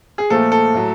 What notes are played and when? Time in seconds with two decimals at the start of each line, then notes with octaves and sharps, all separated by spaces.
0.18 G#4
0.30 A#2 F3 A3 A4
0.52 A4
0.74 A2 F#3